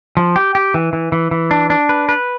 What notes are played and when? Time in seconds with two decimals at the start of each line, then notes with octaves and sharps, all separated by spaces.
0.17 F3
0.36 G4
0.55 G4
0.74 E3
0.93 E3
1.12 E3
1.31 E3
1.51 D4
1.70 D4
1.89 B4
2.09 B4